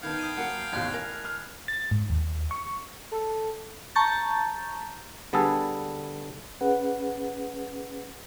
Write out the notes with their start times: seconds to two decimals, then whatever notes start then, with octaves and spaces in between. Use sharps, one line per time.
0.03 D#3 B3 D#4 F5 G5 A5 B5 G#6
0.19 D#6 C7 D#7
0.37 F#3 A#3 F#5
0.73 A1 D#2 B2 F6 F#6 G#6
0.94 A#4 G#5 F7
1.25 F6
1.68 A6
1.91 G#2
2.10 D#2
2.51 C#6
3.12 A4
3.95 A5 A#5 C#6 G6 A6
5.33 D3 G3 B3 G#4 A4
6.61 C#4 G#4 B4 F#5